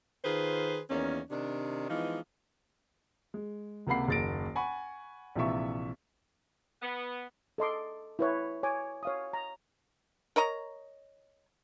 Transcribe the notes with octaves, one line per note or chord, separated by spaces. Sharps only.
D#3 F4 G#4 B4 C5
E2 D#3 A#3 C#4
C3 D#3 D4
E3 F3 G#3 B3 D#4
G#3
C#2 C3 A#3 F#5 B5 C7
F#1 D#2 F#4 A6 A#6 D7
F#5 G#5 B5 C#6
A#1 C3 E3 F4 E5 C#6
B3
A4 D#5 C6 D6
E4 B4 C#5
C#5 G#5 D6
C#5 F5 D#6
A#5
A#4 C#5 D#5 A#5